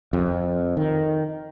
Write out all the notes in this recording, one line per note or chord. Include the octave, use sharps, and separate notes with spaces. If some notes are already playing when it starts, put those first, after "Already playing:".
F2
D#3